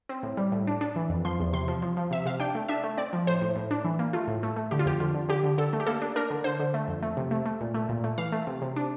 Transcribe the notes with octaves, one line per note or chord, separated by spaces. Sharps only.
C4
A2
G3
A2
D4
D4
E3
F2
F3 C6
E2
C3 C6
F3
F3
F3
C3 E5
C3 F5
D4 G5
A3
D4 E5
A3
C4 D5
F3
A2 C5
A2
A2
D4
E3
A#3
A3 F4
A2
A3
A3
D3 G4
F4
F2 G4
D3 F4
D3
D3 G4
D3
D3 A4
A3
G4
A#3 A4
D4
D4 A#4
D3
D3 C5
D3
A3
F2
A3
C3
A3
A3
A#2
A3
A#2
A3
E3 F5
A3
C3
C3
D4